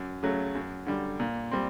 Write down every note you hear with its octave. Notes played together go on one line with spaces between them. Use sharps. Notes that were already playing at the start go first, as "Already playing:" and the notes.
Already playing: F#2
C#3 F#3 A3
F#2
D3 G3
A#2
G3 C4